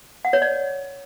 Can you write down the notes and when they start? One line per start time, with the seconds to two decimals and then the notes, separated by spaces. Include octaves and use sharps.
0.25 F#5
0.33 C#5
0.42 D5